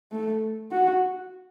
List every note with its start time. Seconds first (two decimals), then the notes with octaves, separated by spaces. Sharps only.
0.12 A3
0.72 F#4